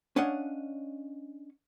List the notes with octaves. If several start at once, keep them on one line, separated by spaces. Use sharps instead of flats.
C#4 D4 C#5 D#5 F5 F#5